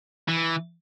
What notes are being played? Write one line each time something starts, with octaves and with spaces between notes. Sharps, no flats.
E3